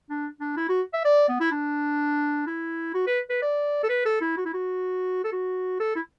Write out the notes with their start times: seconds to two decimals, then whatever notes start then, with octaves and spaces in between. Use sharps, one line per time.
0.10 D4
0.41 D4
0.57 E4
0.69 F#4
0.93 E5
1.05 D5
1.29 B3
1.41 E4
1.52 D4
2.47 E4
2.94 F#4
3.07 B4
3.30 B4
3.42 D5
3.83 A4
3.89 B4
4.06 A4
4.21 E4
4.37 F#4
4.45 E4
4.54 F#4
5.24 A4
5.32 F#4
5.80 A4
5.96 E4